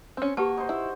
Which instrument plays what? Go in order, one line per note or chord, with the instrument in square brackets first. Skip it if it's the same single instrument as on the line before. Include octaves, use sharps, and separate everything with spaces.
[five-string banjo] C4 C#4
[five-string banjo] A#3 [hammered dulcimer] F#4 [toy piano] G4 B4 A5
[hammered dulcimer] D#4 C5
[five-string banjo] E4